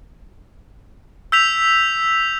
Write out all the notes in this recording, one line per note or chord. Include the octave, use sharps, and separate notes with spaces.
E6 G6 B6 F7